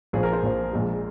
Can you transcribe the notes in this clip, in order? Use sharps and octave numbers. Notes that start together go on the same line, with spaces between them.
A#1 A#2 F3 G#4
A#4
C5
A#1 A#2 F3
A#1 A#2 G#3